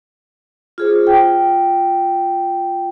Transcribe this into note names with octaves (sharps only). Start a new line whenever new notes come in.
F4 G#4 C5
F4 G5